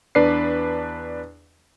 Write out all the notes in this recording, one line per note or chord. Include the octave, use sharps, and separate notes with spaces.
E2 D4 B4 D5 C7